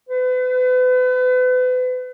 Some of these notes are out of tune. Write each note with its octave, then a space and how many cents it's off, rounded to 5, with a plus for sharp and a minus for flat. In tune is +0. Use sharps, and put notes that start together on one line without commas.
B4 +35